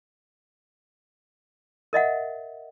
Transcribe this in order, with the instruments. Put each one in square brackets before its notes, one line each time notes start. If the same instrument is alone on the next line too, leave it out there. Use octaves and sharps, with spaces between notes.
[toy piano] A#4 D#5 E5 F#5